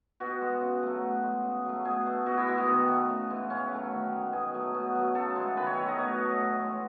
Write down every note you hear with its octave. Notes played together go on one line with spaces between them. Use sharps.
B2 F#4
G#3
C#3
F#3 A3
B2
G#3
C#3
F#3 A3
B2 G#4
A3
B2 F#4
E4
G#3 F#4
B3
D#3
A3
C#3
E3 G#3
A2 C#4
F#3 A3
D#3
G#3
B2 G#4
F#3 A3
B2
F#3 A3
C#3 A4
E3 G#3
D#3 B4
C#5
F#3 A3
D#5
B2 C#5
A3
A2
E3 G#3